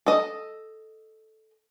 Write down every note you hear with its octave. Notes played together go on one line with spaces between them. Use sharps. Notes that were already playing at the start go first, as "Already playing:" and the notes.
A4 D#5